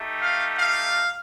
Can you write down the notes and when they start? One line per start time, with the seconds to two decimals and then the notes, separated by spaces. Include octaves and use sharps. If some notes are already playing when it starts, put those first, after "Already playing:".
Already playing: A3 D#4 G4
0.20 F5
0.58 F5